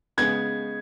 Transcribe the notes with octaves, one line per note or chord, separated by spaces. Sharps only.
C#3 G#3 B3 G#6